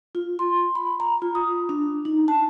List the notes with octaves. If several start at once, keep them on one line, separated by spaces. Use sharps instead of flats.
F4
C6
B5
A#5
F4
D#6
D4
D#4
A5